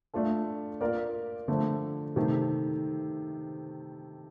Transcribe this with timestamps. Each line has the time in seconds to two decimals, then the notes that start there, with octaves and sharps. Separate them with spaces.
0.14 A3 D4 F4 A4
0.81 A#3 F4 A#4 D5
1.48 D3 F3 A3
2.16 C3 D#3 A3